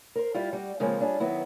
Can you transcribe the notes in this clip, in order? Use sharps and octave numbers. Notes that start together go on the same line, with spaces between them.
A#4 C5
G3 E4 F4
G3 F#4
C#3 F3 G#3 A#3 C4 C#4
G3 C#4 D4 F4 G#4
D#3 F#3 B3 E4